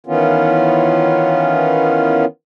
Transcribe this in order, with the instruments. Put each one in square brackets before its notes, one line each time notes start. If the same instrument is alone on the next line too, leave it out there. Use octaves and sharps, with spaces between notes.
[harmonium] D#3 E3 B3 C#4 F4